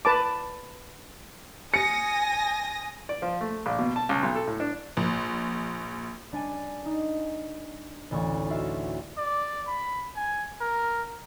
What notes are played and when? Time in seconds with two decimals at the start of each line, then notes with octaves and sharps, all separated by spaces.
0.05 B4 A5 D6
1.74 G#5 D#6 A#6 C#7
3.09 D5
3.22 F3
3.41 A3
3.66 A#1
3.79 B2
3.96 A5
4.09 C#2
4.23 B1
4.35 A4
4.47 A2
4.60 D4
4.97 A#1
6.32 G3 D4 D5 G#5 D#7
6.86 D#4
8.11 A1 D2 C#6
8.49 F4 F#4 E5 F5
9.18 D5
9.67 B5
10.16 G#5
10.61 A#4